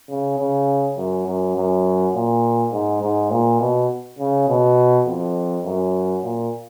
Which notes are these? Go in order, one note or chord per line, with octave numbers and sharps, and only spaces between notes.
C#3
C#3
F#2
F#2
F#2
A#2
G#2
G#2
A#2
B2
C#3
B2
F2
F#2
A#2